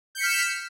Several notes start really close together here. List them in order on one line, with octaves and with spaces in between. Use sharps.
G6 C#7 B6 F6 E7